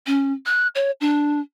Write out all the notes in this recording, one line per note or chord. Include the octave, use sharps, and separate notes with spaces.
C#4
F#6
C#5
D4